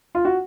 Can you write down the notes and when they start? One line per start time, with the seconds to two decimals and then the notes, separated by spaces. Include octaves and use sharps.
0.15 F4
0.25 F#4